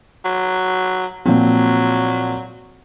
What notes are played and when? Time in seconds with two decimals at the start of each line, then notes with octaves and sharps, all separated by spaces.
0.25 F#3
1.26 A#2 F3 F#3 C4